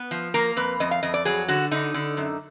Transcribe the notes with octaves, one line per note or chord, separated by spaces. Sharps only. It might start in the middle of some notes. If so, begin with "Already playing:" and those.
Already playing: B3
F3
A#3 A#4
F2 B4
F2 D#5
F5
F2 D#5
D5
F#3 G#4
D3 F#4
D3 D#4
D3
F#2